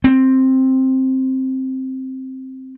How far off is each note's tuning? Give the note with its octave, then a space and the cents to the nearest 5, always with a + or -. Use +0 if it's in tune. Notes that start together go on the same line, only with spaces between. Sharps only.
C4 +5